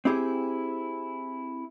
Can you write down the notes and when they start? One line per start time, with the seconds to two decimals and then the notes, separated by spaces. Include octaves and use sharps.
0.05 C4 E4 G4 G#4